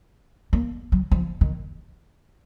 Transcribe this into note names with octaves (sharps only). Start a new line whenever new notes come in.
A#3
F#3
F3
D#3